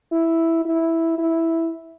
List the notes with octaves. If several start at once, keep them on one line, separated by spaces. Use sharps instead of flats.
E4
E4
E4